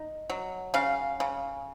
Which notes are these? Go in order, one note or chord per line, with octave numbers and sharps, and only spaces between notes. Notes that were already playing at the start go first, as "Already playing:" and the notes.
Already playing: D#4
F#3
C#3 F5
C#3